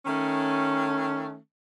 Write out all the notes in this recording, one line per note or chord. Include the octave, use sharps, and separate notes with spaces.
D#3 A3 C#4